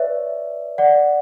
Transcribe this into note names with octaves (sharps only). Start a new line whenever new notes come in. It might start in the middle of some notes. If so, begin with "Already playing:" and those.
Already playing: B4 C#5 D5 E5
D5 F#5